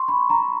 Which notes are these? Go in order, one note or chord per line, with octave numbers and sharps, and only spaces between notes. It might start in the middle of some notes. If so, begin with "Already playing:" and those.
Already playing: C6 C#6
B5
A#5